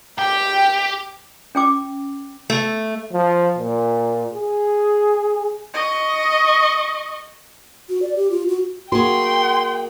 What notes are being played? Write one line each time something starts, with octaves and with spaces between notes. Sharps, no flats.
G4 G5
C#4 G5 D6
A3
F3
A#2
G#4
D#5 C#6
F#4
D5
G4
F4
F#4
A#3 F#4 G#4 G5 C6